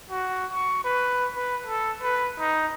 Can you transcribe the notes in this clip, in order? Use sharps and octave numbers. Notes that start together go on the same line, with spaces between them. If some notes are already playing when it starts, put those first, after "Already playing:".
F#4
C#6
B4
B4
A4
B4
D#4